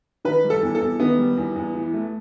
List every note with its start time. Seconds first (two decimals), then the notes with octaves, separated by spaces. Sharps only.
0.25 D#3 B4
0.44 G3
0.50 A4
0.63 E2
0.75 A4
0.81 E2
1.00 D#3 B3
1.18 G3
1.37 E2
1.56 E2
1.75 E3
1.94 A3